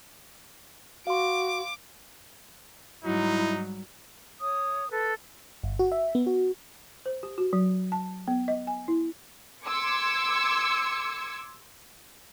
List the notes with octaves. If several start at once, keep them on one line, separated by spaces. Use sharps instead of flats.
F#4 F5 C6 D6
G#2 F#3 G3 D#4 E4
C#5 D#6
A4 B4
G1
F#4
E5
B3
F#4
C5
G4
F#4
F#3
A5
B3
D#5
G#5
E4
C6 D6 E6 G#6 C#7